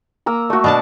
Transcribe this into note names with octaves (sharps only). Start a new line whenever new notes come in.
A#3 A#5 E6
A3 F#4
B2 D4 A5